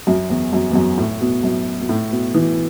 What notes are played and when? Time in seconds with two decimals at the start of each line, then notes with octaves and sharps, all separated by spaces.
0.07 F#2
0.30 E2
0.53 F#2
0.71 E2
0.75 F#2
0.98 A2
1.21 B2
1.43 F#2
1.80 B2
1.89 A2
2.11 B2
2.34 E3